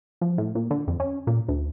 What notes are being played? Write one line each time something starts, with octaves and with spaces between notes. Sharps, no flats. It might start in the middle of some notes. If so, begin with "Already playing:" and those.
F3
A2
A#2
D3
F2
C#4
A#2
D2